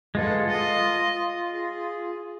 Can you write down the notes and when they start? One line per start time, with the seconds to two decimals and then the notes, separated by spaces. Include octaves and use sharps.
0.15 G#3 F4 A4 B4 F#5
0.48 F4 D#5
1.50 G#4